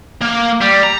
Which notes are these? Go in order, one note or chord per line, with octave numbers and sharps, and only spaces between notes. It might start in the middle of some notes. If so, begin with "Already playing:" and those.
A#3
G3
A#5